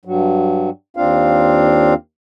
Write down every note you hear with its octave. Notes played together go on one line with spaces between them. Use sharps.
G2 F#3
D#2 C4 D4 F4 F5